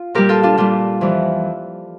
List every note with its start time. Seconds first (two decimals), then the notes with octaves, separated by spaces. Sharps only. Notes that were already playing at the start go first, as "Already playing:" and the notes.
Already playing: F4
0.14 A#2 G3 G4 A#4
0.29 F4 A4
0.43 D4 F4
0.57 A#2 G3 D4 F4
1.01 F2 E3 G3